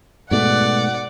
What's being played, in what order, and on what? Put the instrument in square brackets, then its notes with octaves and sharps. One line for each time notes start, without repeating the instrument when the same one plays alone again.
[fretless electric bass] G#2 B2 A3 [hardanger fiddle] D5 [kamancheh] F#5